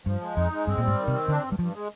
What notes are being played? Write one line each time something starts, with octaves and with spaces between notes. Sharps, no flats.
G2 F3
G#3
F2 D#4
G#3
G2 C4
A#2 G3
G#2
D#3
C3
C4
D3 D4
G2
G3
G2 F3
G#3